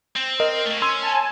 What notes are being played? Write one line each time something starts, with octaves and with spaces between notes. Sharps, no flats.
C4
A#4 D#5
A3 A#3
C#4 C6 E6
G#5 A5